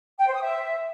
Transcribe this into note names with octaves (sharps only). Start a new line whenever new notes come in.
G5
C5
D#6
E5